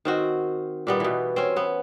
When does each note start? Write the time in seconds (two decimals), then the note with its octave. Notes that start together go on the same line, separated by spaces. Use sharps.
0.05 D#3 C4 F#4
0.87 A#2 G3 B3
1.00 B2 E3
1.36 C4 C#4
1.56 B3